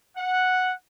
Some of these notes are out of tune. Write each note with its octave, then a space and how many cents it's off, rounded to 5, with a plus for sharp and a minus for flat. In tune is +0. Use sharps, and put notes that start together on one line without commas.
F#5 -5